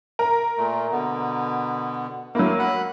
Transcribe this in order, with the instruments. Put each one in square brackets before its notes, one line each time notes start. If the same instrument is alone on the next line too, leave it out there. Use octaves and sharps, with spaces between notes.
[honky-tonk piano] A#4
[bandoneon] A#2 A3
B2 D3 B3
[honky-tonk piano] F#3 A#3 [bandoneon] A3 E4
[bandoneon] F#5 B5 F#6